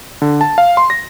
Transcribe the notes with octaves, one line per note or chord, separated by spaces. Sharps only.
D3
A5
F5
C6
A#6